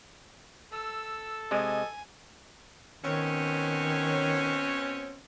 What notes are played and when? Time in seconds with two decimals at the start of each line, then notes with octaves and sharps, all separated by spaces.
0.72 A4 E6
1.51 C3 G#3 D#5 G#5
3.04 B2 D#3 C4 C#4